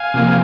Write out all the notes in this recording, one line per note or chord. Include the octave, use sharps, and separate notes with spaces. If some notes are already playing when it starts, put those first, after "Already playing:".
Already playing: F5 G#5
C3 F3 A#3